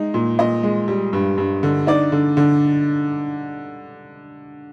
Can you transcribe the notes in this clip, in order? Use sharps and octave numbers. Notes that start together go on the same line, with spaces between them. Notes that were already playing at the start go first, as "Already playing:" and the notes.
Already playing: G#3 D#4
A#2
A#2 D#5
G#3
G3
G2
G2
D3
D#4 D5
D3
D3